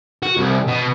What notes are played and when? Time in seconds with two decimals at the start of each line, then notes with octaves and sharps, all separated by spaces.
0.23 F#4
0.38 C2
0.68 B2